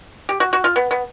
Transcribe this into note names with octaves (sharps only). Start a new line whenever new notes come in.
G4
F#4
F#4
F4
B3
B3